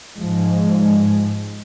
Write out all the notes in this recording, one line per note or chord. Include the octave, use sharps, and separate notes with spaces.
G#2 F3 G#3